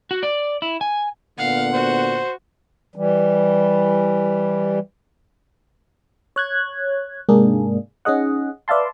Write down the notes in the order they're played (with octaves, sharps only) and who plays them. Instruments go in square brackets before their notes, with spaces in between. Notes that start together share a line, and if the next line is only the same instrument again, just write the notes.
[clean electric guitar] F#4
D5
E4
G#5
[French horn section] A#2 D3 B3 [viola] F5 [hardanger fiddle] F#5
[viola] F#4 [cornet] C5
[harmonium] E3 G3
[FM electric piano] C#5 F#6 G#6
G#2 C3 G#3 A#3 D4 G#4
C#4 D#4 G#4 D#5 F#5
B4 D5 E5 F5 A5 C6